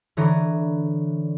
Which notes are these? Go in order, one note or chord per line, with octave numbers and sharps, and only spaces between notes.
D3 E3 C#5 A#5 D#6